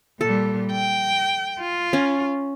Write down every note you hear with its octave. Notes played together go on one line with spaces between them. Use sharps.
A#2 G3 A4
G5
F4
C#4